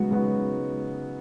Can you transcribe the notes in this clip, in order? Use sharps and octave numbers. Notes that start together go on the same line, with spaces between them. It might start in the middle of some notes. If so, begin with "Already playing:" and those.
Already playing: C#3 F#3 G#3 B3 D#4 F#4
C#3 F#3 B3 D#4 F#4